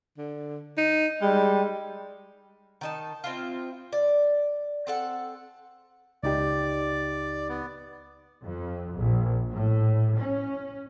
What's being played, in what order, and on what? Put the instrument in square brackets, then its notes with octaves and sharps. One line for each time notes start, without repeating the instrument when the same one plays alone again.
[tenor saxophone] D3
D#4
[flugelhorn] G3 [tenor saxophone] G#3
[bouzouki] D#3 D#4 A5
C4 E4 F4
D5
C4 A4 F#5
[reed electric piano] C#2 D#4 G4 [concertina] D5
[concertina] B3
[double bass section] F2
A#1
A2
C#4